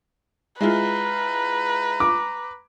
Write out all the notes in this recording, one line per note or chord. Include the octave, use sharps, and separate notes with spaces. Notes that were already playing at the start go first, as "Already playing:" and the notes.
G#3 E4 F4 B4 A#5
D6